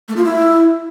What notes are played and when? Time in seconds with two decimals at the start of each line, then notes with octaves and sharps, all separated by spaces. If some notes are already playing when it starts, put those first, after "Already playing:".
0.09 A3
0.16 F4
0.24 E4